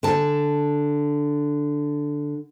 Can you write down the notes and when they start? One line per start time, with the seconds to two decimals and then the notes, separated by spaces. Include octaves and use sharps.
0.03 D3 A5